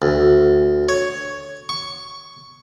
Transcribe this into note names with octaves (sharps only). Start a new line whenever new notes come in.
D2
C#5
C#6